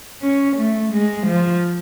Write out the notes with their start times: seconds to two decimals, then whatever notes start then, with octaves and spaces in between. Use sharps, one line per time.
0.22 C#4
0.57 A3
0.93 G#3
1.28 F3